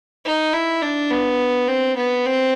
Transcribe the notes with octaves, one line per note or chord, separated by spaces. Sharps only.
D#4
E4
D4
B3
C4
B3
C4